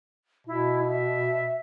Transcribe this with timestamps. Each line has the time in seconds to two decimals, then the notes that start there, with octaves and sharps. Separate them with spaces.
0.47 B2 E4
0.88 E5